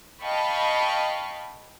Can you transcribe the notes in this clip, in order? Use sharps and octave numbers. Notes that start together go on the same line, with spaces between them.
D#5 F5 G5 A5 B5 C#6